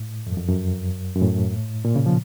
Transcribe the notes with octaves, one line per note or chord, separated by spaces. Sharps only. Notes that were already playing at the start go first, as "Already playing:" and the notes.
Already playing: A2
F2
F#2
F2
F#2
F#2
A2
A#2
C#3
F3